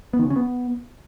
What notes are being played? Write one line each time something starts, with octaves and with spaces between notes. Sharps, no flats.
B3
D#3
C#3
C#4
B3